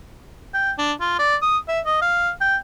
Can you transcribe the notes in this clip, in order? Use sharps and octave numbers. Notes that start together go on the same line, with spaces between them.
G5
D4
F4
D5
D#6
E5
D#5
F5
G5